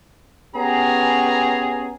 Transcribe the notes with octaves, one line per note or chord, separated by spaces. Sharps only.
B3 C#4 G4 G#4 A#5